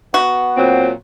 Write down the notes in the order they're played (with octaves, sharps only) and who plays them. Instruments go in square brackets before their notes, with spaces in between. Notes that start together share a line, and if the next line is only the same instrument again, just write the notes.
[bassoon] B3 [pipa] F#4
[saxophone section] A#2 F#3 C4